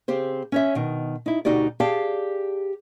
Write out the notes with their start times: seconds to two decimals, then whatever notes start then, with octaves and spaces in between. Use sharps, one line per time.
0.08 C#3 C4 G4 C5
0.52 C#4 C#5 E5
0.75 B2 D#3
1.26 D#4 E4
1.45 D2 B2 D#4 F#4 G4 D5
1.80 G4 G#4 D5 F5 G5 A5